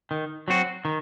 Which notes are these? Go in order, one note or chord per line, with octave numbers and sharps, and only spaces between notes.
D#3
F#3 C4 F#4
D#3